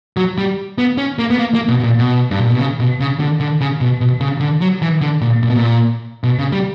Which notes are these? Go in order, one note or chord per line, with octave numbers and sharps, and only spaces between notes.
F#3
G3
B3
C#4
A#3
B3
A#3
A#3
B2
B2
A#2
B2
G2
A#2
B2
C#3
B2
C#3
D3
D3
C#3
B2
B2
C#3
D3
F#3
E3
D3
A#2
A#2
B2
A#2
B2
C#3
G3